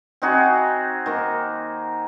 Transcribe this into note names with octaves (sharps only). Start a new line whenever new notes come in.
C4 D#4 F#4 G#4
D#3 A#3